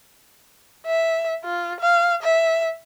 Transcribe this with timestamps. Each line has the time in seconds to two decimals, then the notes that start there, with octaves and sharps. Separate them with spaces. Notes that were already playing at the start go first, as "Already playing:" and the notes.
0.86 E5
1.45 F4
1.80 F5
2.23 E5